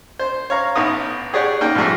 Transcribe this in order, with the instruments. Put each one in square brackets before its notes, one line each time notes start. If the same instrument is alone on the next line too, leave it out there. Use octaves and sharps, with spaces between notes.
[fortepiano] C5
C#5 F5 A#5
A1 B3 D#4 D#6
G4 G#4 C#5 D5 F#5 G5
A#3 D#4 G5
G#2 F3 G3 A3 A#3